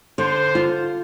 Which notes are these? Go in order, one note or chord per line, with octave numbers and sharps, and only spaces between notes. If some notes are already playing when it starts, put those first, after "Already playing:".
D3 C5
F4